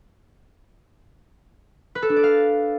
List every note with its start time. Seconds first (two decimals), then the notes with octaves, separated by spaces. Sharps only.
1.95 B4
2.02 A4
2.09 D4
2.16 D5
2.24 F5